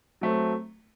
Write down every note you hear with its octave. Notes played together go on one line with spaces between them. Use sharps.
F#3 A3 C4